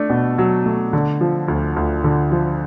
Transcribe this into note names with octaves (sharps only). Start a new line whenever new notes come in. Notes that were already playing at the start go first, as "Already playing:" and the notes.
Already playing: A3 D4
B2
F#3
A3
D3
F3
D2
D2
D3
F3